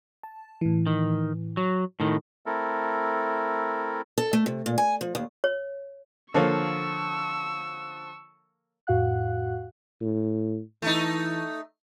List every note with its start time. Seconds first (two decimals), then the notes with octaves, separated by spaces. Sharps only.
0.23 A5
0.61 A2 E3
0.87 D#3
1.57 F#3
2.00 A2 D#3
2.46 A3 C4 E4 A4 A#4
4.18 A4
4.33 A3
4.46 C3
4.66 A#2
4.78 G#5
5.01 F3
5.15 D#2
5.44 C#5
6.34 D3 F3 A#3 A4 C#5 C#6 E6
8.87 F2 A2 F#4 F5 F#5 F#6
10.01 A2
10.82 E3 A3 D#4